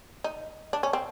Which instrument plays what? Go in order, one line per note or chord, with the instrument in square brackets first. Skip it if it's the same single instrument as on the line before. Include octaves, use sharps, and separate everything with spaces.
[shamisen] D#4
D4
C#4
C4